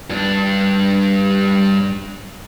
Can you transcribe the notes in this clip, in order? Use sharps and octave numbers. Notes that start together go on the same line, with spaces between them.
G2 D4